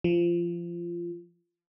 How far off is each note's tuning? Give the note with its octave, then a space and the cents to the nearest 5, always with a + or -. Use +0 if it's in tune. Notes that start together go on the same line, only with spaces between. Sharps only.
F3 -20